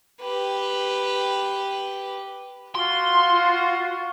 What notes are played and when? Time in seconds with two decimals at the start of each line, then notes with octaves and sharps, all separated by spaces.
0.22 G4 B4
2.75 F4 F#4 C6